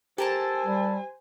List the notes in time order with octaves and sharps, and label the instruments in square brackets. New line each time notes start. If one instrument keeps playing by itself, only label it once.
[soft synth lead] G4 [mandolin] A4 A#4 A5 [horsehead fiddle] C5 G#5
[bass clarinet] G3